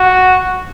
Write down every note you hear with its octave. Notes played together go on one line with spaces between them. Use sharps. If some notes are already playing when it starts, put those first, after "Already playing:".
Already playing: F#4